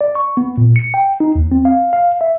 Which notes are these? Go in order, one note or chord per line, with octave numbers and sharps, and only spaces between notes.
D5
C#6
B3
A#2
C#7
G5
D#4
D#2
C4
F5
F5
E5